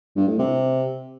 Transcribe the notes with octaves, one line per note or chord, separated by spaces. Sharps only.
G2
A2
C3